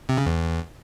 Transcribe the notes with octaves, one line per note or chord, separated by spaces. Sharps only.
C3
C#3
E2